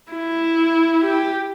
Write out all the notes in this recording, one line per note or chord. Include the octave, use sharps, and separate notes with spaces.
E4
G4